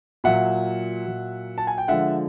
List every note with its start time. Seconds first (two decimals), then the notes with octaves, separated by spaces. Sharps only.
0.24 A#2 F#3 E5 F#5
1.06 A#2 F#3
1.58 A5
1.67 G#5
1.78 G5
1.88 D3 F3 G#3 E5 F#5